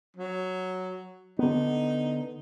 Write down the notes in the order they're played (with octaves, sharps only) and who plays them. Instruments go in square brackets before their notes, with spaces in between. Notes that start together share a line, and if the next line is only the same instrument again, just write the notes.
[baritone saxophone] F#3
[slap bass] D3 B3 [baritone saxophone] D#4